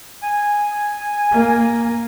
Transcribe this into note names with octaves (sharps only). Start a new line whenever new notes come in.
G#5
A#3